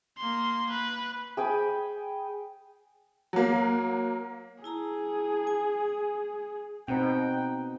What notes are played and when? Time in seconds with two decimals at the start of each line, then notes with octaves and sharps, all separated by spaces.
0.18 A#3 C6
0.70 B4
1.37 G#4 G5 G#5 B5
3.33 F#3 A#3
4.64 E4 G#4 A5 A#5
5.47 G#5
6.88 B2 C4 D#4 C5 F#5 G5